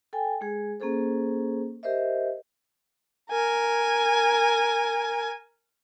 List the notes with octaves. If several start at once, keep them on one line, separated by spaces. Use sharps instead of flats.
A4 G5 G#5
G#3 G#4
A#3 C#4 G#4 A4 C5
G4 A#4 C5 D#5 E5
A#4 G#5